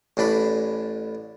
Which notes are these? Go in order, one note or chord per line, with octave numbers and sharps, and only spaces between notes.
A1 A2 D4 B5